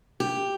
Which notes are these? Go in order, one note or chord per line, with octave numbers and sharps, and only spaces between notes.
G4